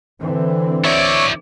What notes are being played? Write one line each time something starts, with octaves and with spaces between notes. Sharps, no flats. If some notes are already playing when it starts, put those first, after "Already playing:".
D3 E3 C4
E4 C#5 D5 E5 C#6